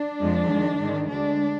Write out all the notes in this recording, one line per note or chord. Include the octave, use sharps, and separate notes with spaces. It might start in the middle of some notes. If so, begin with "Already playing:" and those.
Already playing: D4
F2 F3 G#3
F2 D#3 G#3
G#2 D#3 G#3
D2 D3 G#3 D4